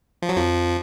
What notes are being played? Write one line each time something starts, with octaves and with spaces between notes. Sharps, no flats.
F3
F#3
F2 F3